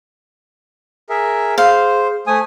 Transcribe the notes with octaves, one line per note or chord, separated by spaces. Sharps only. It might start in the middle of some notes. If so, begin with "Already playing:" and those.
G#4 A#4 E5
G#4 C5 F5
A3 C5 G#5 D#6